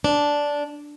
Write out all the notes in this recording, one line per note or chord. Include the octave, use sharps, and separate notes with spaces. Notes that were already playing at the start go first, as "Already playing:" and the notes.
D4